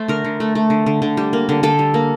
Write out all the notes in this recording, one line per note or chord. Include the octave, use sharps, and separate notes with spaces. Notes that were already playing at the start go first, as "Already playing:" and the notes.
Already playing: A3 C5
D3 A#4
D3
A3
A3
D3
D3
D3
G3
A#3
D3
D3 A4
G3
A#3